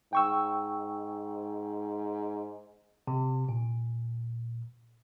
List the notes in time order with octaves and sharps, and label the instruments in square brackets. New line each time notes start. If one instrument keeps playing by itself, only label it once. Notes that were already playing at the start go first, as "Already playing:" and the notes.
[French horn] G#2 [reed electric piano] G5 C#6 E6
[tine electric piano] C3
A#2